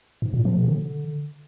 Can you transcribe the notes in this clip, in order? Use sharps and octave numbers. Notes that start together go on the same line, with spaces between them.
G#2
A#2
F3
B2
D3